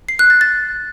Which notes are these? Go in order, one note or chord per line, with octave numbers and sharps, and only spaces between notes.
C7
F#6
A6
A6